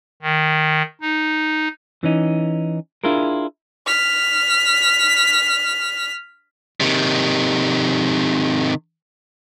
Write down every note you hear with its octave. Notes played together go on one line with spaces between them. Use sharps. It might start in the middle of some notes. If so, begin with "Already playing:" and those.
D#3
D#4
E3 C#4 D#4
D4 E4 F4 G#4 A#4
F6 B6
C3 D#3